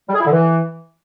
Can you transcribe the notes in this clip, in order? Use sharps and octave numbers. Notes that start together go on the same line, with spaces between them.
G3
G#4
E4
D3
E3